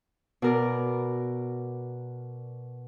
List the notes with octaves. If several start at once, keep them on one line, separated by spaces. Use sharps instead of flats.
B2 A#4 D5